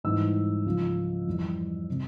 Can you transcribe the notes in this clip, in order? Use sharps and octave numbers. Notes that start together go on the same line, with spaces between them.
G#2 E3 G3 E6
C#2 C#3 F3
F2 E3 G3
C3 G3